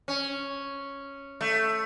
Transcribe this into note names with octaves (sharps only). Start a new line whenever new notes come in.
C#4
A3